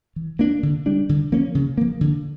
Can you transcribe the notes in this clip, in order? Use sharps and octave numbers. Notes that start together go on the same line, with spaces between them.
E3
A#3 D4
D3
G3 D4
D3
F3 A#3 C#4
C#3
F3 A#3
D3